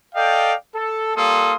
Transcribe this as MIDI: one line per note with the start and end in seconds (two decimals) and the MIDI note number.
0.15 0.54 69
0.15 0.54 74
0.15 0.54 75
0.15 0.54 77
0.15 0.54 79
0.75 1.14 69
1.15 1.55 55
1.15 1.55 58
1.15 1.55 65
1.15 1.55 69
1.15 1.55 84
1.15 1.55 87